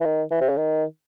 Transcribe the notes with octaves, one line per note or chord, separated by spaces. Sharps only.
E3
D#3
E3
C3
C#3
D#3